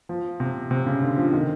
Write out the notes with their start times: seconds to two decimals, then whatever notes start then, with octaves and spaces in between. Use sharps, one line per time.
0.09 F3
0.40 C3
0.71 C3
0.86 C#3
1.02 D3
1.18 F3
1.33 D#3